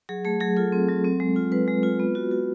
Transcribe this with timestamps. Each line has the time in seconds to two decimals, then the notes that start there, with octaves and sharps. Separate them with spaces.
0.09 F#3 G#4
0.25 A3 G#4
0.40 F#3 G#4
0.57 F4 A4
0.72 C4
0.88 F#3
1.04 C4
1.20 G#3
1.36 F4
1.52 G#3 B4
1.68 G#3
1.83 F4
2.00 B3
2.15 F#4
2.31 F#4